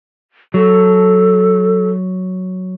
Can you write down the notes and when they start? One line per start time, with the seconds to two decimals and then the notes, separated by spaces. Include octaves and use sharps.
0.54 F#3 A4